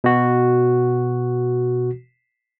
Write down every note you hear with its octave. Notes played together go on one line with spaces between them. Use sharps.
B2 F#4